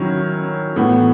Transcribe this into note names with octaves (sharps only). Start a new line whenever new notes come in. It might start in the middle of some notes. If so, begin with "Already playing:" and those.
Already playing: D#3 F#3 C#4 E4
A2 E3 B3